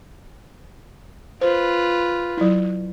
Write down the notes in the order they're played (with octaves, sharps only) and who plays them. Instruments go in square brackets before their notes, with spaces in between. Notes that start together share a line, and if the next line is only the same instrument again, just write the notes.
[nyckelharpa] F4 B4 [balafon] C5
[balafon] F#3 E4